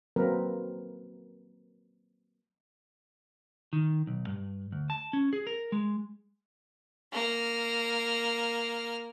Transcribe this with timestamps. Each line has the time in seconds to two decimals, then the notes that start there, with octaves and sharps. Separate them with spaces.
0.16 F#3 A#3 C4 A#4 B4
3.73 D#3
4.07 B1
4.27 G2
4.72 D2
4.90 A5
5.13 C#4
5.33 G#4
5.47 A#4
5.72 G#3
7.13 A#3 F6